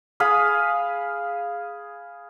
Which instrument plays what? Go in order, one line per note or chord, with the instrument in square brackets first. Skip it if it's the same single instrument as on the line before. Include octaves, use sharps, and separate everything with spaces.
[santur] G#4 F5 B5 D#6